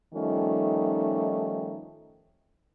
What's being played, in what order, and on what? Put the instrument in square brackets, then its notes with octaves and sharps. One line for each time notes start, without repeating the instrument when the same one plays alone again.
[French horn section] D#3 F3 G3 A3 C#4 D#4